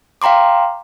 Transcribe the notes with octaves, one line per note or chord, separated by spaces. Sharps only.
F5 G5 A#5 C6 D6